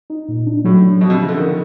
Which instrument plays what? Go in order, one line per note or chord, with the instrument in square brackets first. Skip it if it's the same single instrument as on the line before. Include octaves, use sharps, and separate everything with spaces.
[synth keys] D#4
A#2
D4
[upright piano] A2 [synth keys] F#3
[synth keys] D4
[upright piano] B2 [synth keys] F3
[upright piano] C3
[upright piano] C#3 [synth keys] F3
[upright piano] D3
[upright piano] D#3 [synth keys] F3